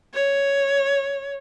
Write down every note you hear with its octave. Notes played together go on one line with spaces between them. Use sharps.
C#5